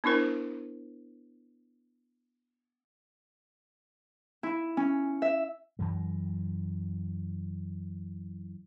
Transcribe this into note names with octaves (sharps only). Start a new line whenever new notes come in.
B3 D4 E4 A#4 C5
E4
C#4
E5
F#2 E3 G#3